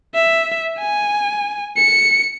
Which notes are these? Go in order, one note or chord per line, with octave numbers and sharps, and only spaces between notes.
E5
G#5
C#7